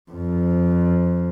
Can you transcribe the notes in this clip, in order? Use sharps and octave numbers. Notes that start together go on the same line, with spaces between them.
F2